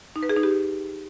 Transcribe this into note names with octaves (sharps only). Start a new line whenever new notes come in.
D#4
B4
G#4
D#4
G4